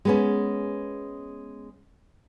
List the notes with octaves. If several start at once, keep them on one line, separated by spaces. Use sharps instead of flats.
G#3 B3 C#4